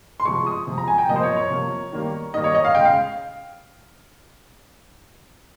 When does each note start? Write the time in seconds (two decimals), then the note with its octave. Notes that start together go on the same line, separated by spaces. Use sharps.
0.20 C6
0.25 C3 F3 G#3 C#6
0.47 D#6
0.67 C3 F3 G#3
0.78 A#5
0.88 G#5
0.98 G5
1.08 C3 F3 A#3 D#5
1.16 C5
1.23 C#5
1.36 C#5
1.50 C3 F3 A#3
1.92 D#3 G3 A#3
2.33 D#3 G3 A#3 D#5
2.44 C#5
2.55 D#5
2.65 F5
2.75 C#3 G#3 G5
2.85 F5